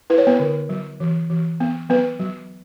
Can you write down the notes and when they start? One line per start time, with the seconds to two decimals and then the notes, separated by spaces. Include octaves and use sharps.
0.10 E4 B4
0.18 C#5
0.27 B3 B4
0.39 D3
0.69 F#3
1.00 E3
1.30 E3
1.60 B3
1.89 F#3 B3 B4
2.19 F#3